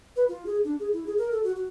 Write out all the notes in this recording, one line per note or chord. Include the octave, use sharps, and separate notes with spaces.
B4
F4
G#4
D4
G#4
E4
G#4
A#4
A4
F#4
F#4